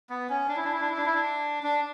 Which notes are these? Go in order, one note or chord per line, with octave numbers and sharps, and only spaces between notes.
B3
C#4
D4
E4
D4
E4
D4
E4
D4
E4
D4
D4